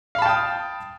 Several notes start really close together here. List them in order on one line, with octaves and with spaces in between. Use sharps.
F5 B5 A5 G5 D#6